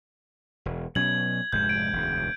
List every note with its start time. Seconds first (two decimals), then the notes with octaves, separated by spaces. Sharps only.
0.66 E1
0.95 B2 F#3 C#4 G#6 F#7
1.53 F1 G#2 G#3 G6
1.69 D7
1.93 E1 D2 G#2